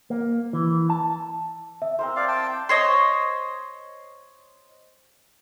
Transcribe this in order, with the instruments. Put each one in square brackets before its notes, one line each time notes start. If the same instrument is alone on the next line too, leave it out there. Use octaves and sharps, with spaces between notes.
[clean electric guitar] A#3
E3
A5
[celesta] E5
[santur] C4 A#4 C5
[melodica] D5 F5
G5 A5
[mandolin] C5 C#5 D#5